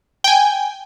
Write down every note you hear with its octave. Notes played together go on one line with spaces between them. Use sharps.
G5 G#5